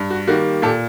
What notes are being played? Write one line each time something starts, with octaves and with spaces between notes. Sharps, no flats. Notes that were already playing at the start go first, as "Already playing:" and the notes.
Already playing: G2
F#4
D#3 G3 A#3 F#4
A#2 G4 A4